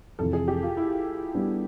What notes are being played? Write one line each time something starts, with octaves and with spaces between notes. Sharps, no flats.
F2 C3 E3 A4
G#4
G4
F4
E4
G3 B3 D4